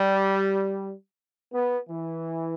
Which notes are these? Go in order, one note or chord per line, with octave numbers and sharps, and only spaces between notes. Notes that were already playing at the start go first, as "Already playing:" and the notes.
Already playing: G3
B3
E3